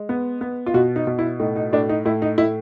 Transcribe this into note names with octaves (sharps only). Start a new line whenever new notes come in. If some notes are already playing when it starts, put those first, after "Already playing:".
Already playing: G#3
B3
B3
F4
B2 F#4
D#4
B2
E4
A2 D#4
D#4
A2 D4
D#4
A2 E4
D#4
A2 E4